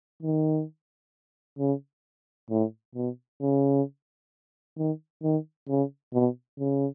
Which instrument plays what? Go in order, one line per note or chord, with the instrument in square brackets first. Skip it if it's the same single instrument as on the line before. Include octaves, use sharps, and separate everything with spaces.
[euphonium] D#3
C#3
A2
B2
C#3
D#3
D#3
C#3
B2
C#3